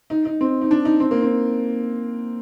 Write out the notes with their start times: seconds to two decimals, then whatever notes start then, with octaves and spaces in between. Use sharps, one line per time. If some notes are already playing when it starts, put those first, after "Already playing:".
0.10 D#4
0.25 D#4
0.41 C4
0.62 D#4
0.71 D4
0.85 D#4
1.00 C4
1.11 A#3
1.22 C4